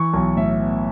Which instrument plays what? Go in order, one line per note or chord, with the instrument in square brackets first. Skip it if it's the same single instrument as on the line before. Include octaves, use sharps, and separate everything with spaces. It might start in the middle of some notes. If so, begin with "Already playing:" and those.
Already playing: [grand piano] E3 C#6
B1
A2 E5
B3